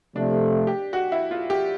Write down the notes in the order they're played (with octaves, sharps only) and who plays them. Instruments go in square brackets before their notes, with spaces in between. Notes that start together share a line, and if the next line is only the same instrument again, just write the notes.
[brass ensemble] C3 F3 A3 [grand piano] D4
[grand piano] G4
F#4
E4
F4
G4